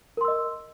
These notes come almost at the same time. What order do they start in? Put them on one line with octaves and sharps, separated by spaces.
A#4 C6 E6 D#5